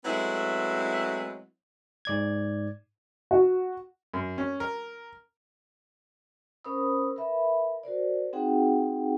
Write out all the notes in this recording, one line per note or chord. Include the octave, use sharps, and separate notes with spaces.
F#3 G#3 A3 B3 C4 E4
G#2 D5 G#6
F#4
F#2
C#4
A#4
C#4 A#4 C5 B5 D#6 E6
A#4 B4 E5 B5
F#4 A#4 C5 D5
C4 D#4 F#4 G#4 F#5 G5